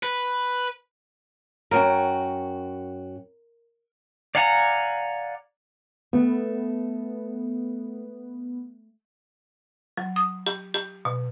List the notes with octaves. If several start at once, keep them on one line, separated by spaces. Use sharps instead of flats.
B4
F#2 F#4 A#4 G5
D5 F5 F#5 G#5 A#5
A3 B3
F#3
D#6
G4
G4
B2